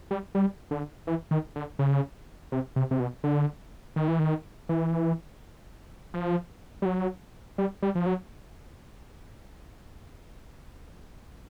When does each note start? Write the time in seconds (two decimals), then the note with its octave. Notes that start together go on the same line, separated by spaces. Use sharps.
0.11 G3
0.35 G3
0.71 D3
1.07 E3
1.31 D#3
1.56 D3
1.79 C#3
2.52 C3
2.76 C3
2.91 C3
3.00 B2
3.24 D3
3.96 D#3
4.08 E3
4.19 D#3
4.69 E3
6.14 F3
6.82 G3
6.85 F#3
7.58 G3
7.82 G3
7.95 F3
8.06 F#3